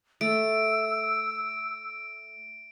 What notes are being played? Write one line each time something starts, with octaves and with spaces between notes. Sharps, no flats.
A3 E6 D7